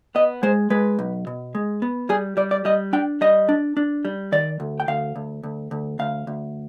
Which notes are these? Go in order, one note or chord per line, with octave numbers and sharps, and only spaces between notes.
B3 D#5
G#3 C5
G#3 B4
B1
B2
G#3
B3
G3 G#4
G3 D5
D5
G3 D#5
D4 G5
G3 D#5
D4
D4
G3
D#3 D5
D2
G5
D2 F5
D2
D2
D2
D2 F5
D2